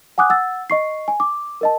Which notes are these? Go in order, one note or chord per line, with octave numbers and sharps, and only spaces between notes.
F#5 G#5 D6 D#6 F#6
F#5 E6 A6
D#5 C#6 C7
G#5
D6
A#4 D#5 A5